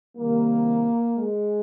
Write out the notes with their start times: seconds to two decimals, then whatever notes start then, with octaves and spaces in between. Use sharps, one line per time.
0.17 C3 D#3 G3 A#3
1.16 G#3